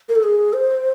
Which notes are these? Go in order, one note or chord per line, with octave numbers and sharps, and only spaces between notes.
A#4
A4
G#4
C5